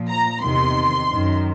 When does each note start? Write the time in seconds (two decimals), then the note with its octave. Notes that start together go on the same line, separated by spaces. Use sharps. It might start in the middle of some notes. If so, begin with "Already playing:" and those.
Already playing: A#2 F3
0.09 A#5
0.42 E2 C3 D#3 C6
1.09 F#2 D#3